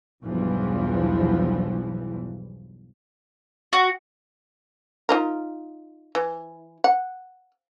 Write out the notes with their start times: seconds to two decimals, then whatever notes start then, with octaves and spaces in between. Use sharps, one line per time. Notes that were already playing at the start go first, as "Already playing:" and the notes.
0.24 B1 E2 G2 E3 F3
3.73 F#4
5.09 D#4 F4 A#4
6.15 E3
6.84 F#5